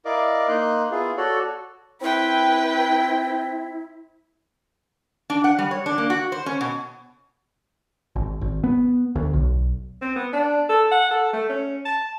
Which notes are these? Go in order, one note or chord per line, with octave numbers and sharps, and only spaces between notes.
E4 A#4 D5 D#5 F5 D6
A#3 D#4 C6 F#6
B3 E4 F4 G#4
F#4 A4 C#5 D5
C4 E4 B4 G5
D4
F#5
G3
C#5
D4
A#3
F#4
C5
C#4
B2
G#1
G#1
B3
D2
B1
C4
B3
D4
A4
F#5
A4
A3
C#4
A5